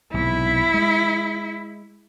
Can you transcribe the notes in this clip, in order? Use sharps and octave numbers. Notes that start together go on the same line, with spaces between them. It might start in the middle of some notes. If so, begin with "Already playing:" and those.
B1 G#2 C3 E4
G#3